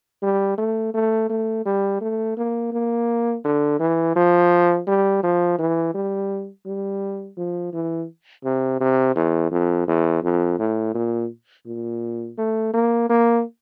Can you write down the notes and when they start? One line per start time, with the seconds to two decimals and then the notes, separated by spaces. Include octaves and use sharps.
0.23 G3
0.58 A3
0.94 A3
1.29 A3
1.65 G3
2.01 A3
2.37 A#3
2.72 A#3
3.44 D3
3.80 E3
4.16 F3
4.87 G3
5.23 F3
5.58 E3
5.94 G3
6.66 G3
7.37 F3
7.73 E3
8.44 C3
8.80 C3
9.16 E2
9.51 F2
9.88 E2
10.23 F2
10.59 A2
10.95 A#2
11.66 A#2
12.38 A3
12.74 A#3
13.10 A#3